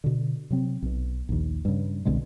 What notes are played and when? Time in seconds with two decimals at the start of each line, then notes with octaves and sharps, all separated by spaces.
0.04 B2 D3
0.50 C3 F#3 C4
0.82 B1 B2
1.29 A#1 D#2
1.65 G2 C#3
2.05 C2 B2 D3 G#3